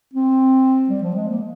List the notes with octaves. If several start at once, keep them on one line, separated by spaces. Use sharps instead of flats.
C4
G3
F3
G#3
A#3